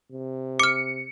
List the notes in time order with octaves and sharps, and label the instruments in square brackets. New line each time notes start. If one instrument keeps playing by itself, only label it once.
[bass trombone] C3
[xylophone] D6 F6 [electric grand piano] C#7